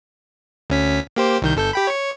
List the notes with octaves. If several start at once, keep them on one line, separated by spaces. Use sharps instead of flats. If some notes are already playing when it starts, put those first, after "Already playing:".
D2 C#4 B6
A#3 G4 C5
C2 D#3 G6
G1 A4 G6
G4 G5 B5
C#5 C#6